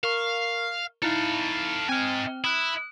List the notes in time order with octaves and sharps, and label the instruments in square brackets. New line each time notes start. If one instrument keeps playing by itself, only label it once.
[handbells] A#4 C#6 [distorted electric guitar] F5
[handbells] D#4 E4 [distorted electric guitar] A4 F5
[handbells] C4 F6 [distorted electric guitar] D#4 G#5
[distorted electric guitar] E4 [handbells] D#6 F#6